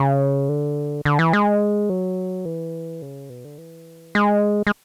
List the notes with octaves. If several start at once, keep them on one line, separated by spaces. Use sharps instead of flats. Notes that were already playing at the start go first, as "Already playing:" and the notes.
Already playing: C#3
D3
D3
E3
G#3
F#3
E3
C#3
B2
D3
E3
G#3
G#3